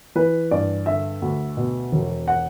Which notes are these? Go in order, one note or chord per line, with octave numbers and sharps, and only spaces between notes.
E3 B4
G2 D5
D3 E5
D2
B2
E1
F#5